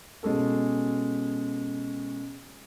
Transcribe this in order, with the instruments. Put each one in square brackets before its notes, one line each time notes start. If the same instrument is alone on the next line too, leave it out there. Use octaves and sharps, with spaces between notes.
[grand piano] B2 G#3 C#4 A4